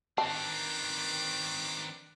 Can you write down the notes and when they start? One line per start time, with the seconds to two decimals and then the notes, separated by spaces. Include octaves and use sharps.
0.18 D#3 C4 D4 B4 A5 D6